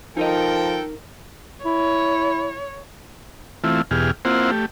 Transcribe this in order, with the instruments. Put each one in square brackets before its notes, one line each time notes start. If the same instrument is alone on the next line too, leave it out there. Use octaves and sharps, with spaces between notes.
[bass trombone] F3 [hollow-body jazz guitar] D#4 D#5 [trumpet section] A4 G5 [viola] A#4
[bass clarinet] E4 [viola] C#5
[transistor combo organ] E3 A3 C4 E4 F4
E2 B2 G4 G#4 F6
A#3 C4 E4 F4 C5 F#5
A3 G4